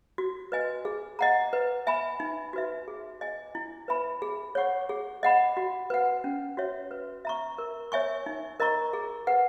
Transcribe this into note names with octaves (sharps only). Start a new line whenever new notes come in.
F#4
B4 D#5 G#5
G#4
D#5 F#5 A#5
B4
E5 G#5 B5
D#4
F#4 B4 E5
G#4
D#5 G#5
E4
B4 E5 G#5 B5
G#4
C#5 F#5 C#6
G#4
D#5 F#5 B5
F#4
B4 F#5
C#4
F#4 C#5 E5
B4
E5 A#5 C#6
A#4
C#5 E5 G#5 C#6
D#4
A#4 D#5 A#5 C#6
G#4
B4 F#5